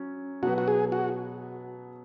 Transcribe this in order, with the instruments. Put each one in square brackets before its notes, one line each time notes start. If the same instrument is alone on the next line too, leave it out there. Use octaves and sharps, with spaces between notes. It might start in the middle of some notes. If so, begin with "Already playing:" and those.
Already playing: [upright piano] F#3 C#4
[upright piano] B2 F#3 B3 [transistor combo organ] F#4
[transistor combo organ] F#4
G#4
F#4